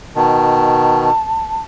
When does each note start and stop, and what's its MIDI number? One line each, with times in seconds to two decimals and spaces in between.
0.16 1.10 47
0.16 1.10 51
0.16 1.59 81